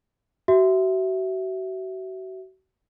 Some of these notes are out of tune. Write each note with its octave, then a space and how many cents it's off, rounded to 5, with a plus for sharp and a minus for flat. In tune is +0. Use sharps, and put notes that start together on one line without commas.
F#4 +35 E5 +0